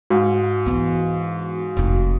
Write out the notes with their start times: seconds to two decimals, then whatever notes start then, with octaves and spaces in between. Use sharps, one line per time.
0.10 G#2 F#4 F5
0.66 E3 B3
1.77 F1 D#3